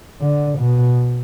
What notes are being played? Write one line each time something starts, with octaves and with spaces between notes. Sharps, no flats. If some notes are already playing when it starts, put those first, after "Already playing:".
D3
B2